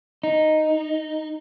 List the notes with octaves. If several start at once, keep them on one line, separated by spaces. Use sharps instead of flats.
D#4